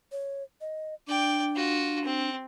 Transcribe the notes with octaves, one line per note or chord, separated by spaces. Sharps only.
C#5
D#5
D4 D5 G5
F4 F#4
C4